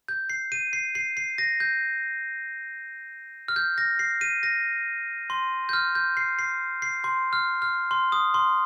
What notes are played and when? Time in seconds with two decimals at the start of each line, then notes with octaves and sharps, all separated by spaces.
0.08 G6
0.30 C7
0.52 D#7
0.73 C7
0.95 C7
1.17 C7
1.38 A#6
1.60 G6
3.48 F6
3.56 G6
3.78 A#6
3.99 C7
4.21 D#7
4.43 A#6
5.30 C6
5.69 G6
5.73 F6
5.95 G6
6.17 C7
6.39 C7
6.82 C7
7.04 C6
7.33 F6
7.62 F6
7.91 C6
8.12 D#6
8.34 C6